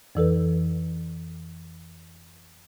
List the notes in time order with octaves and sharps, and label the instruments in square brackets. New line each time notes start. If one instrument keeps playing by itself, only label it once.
[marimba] F2 E3 A4 B4